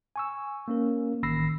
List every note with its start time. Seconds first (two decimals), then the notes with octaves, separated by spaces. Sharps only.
0.16 G#5 C#6 E6
0.68 A#3 C#4 A#4
1.23 A1 D#3 B5 E6 A#6 C7